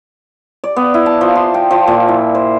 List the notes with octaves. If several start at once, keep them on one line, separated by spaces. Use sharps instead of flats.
D5
B3
E4
A5
F3
C6
G5
F3
A#2
E4
C5